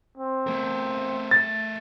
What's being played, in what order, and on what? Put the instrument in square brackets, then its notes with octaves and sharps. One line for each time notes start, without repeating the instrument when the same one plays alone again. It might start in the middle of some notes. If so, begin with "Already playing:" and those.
[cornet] C4
[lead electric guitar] A3 A#4
[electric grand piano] A6